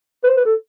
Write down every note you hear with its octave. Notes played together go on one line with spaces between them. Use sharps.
B4
C5
B4
A4